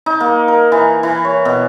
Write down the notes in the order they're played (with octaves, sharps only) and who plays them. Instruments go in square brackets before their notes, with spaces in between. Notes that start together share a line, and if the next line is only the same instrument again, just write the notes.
[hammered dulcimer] D#4
A#3
A#4
E3
E3
C#5
B2